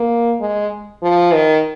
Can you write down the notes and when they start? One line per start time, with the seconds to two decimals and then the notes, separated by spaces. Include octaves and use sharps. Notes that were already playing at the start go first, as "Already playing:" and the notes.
Already playing: A#3
0.40 G#3
1.02 F3
1.34 D#3